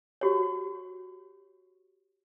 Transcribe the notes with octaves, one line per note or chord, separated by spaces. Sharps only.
F#4 G4 C#5